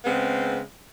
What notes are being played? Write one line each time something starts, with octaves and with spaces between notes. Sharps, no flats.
C#3 G#3 B3 C4